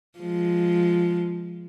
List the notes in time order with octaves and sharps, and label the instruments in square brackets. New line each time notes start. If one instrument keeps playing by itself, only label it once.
[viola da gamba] F3 G#3